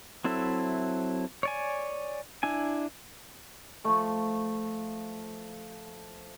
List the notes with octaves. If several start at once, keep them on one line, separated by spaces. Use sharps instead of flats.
F#3 C4 E4 A4 E5
C#5 D5 G#5
D4 E4 G#5
F3 A3